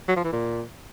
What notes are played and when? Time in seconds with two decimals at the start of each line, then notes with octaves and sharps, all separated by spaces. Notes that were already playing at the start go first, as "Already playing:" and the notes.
0.08 F#3
0.16 F3
0.24 E3
0.32 A#2